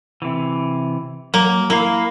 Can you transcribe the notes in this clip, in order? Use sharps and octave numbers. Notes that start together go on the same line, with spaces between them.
C3 E3
F#3 A#3
A#3 E4 A#4 F5